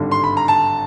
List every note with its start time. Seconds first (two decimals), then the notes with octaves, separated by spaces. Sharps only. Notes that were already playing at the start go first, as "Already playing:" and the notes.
Already playing: G#1 G2 D3
0.11 C6
0.24 B5
0.37 A#5
0.48 A5